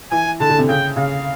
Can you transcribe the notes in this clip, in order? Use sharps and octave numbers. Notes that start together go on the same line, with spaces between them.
E3 G#5
D3 A5
D3
C3
C#3 G5
C#3 F5